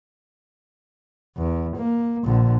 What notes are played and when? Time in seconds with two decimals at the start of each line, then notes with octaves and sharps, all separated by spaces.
1.37 E2
1.77 A#3
2.25 A#1 D3